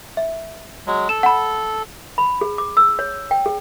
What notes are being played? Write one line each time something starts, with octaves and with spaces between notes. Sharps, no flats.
E5
F#3 G#3
A4 E7
F#5 B5
B5
G#4
D6
E6
C#5
G5
G#4